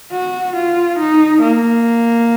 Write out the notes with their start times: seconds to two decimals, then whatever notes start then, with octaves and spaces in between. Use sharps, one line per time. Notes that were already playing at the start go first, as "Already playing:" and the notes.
0.12 F#4
0.56 F4
0.99 D#4
1.42 A#3